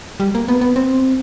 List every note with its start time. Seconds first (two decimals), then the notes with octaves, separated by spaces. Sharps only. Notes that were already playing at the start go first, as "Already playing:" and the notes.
0.20 G3
0.35 A#3
0.48 B3
0.61 B3
0.76 C4